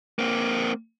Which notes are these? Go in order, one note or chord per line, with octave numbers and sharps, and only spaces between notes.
A#3 C4